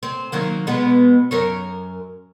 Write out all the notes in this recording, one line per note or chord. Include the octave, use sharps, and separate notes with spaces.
C4
D#3 F#3 A#3
B2 G#3 B3
F#2 A#4 C#5